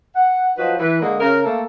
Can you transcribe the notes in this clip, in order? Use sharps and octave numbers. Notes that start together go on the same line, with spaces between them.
F#5
F3 F#3 D#4 F#4 B4
E3 B4
D3 G#3 A#3
C#3 A#4
A3 A#3 A4